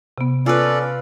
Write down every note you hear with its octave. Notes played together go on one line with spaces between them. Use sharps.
C3 B3
C#4 F4 A4 B4 D5